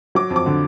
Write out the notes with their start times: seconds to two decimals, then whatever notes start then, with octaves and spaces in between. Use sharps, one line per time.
0.15 F#3 D6
0.30 F2
0.36 D6
0.46 D3